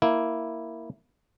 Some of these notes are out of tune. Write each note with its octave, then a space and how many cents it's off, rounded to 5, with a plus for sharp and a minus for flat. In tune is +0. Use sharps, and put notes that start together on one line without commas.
A#3 +0 E4 -5